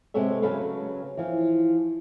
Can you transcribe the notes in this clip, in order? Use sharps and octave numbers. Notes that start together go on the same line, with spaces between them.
C3 G#3 B3 A4 C#5 E5
C#3 F#3 A4 B4 C#5 F5
E3 F3